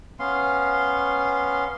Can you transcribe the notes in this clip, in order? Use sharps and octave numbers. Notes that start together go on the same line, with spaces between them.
B3 C#4 F5 C6